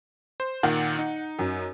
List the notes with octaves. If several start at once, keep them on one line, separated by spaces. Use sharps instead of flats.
C5
A#2 D#3 F#5
D#4
F#2